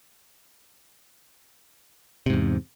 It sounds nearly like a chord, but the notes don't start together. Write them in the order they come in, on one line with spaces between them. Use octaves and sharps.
C3 G#2 E2